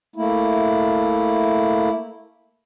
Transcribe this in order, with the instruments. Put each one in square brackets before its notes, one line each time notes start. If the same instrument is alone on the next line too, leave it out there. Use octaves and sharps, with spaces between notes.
[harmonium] A3 A#3 E4